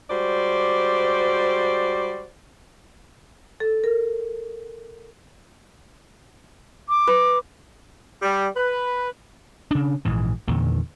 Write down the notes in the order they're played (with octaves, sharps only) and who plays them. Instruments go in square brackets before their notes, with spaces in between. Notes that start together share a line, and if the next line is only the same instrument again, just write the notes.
[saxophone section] G3 G#3 F#4 C5 D5
[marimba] A4
A#4
[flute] D6
[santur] B4
[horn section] G3
B4
[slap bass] C#3 D4
A#1 G#2 E3
E2 A#2 D3 D#3